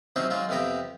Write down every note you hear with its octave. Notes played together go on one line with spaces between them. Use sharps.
C3 F#3 C4 C#4 D#4 G#4
F#3 G#3 D#4 F4
F2 C3 B3 G4 G5 A#5